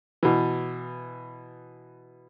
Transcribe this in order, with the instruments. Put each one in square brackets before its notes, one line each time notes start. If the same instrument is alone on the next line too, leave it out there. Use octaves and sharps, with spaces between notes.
[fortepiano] B2 E3